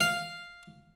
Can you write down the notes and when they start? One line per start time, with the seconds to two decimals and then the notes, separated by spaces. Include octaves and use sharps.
0.01 F5